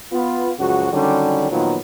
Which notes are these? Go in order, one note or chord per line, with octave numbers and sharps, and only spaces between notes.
B3 F4
C#2 F#2 F3 F#4
D3 D#3 F#3 G3 C#4
A#2 D#3 F3 F#3 B3